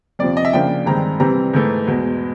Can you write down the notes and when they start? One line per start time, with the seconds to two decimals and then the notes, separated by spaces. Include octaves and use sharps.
0.19 F2 C3 F3 D5
0.37 D#5
0.45 E5
0.53 C#3 F3 A#3 D4 G5
0.86 G2 D#3 G#3 C4 A#5
1.20 C3 E3 G3 C4 A#5
1.53 G#2 E3 A3
1.87 E2 B2 G#3